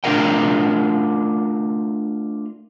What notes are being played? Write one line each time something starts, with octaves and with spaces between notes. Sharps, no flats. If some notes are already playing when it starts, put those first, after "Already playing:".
A3 D4 F4 A#4 D#5 G5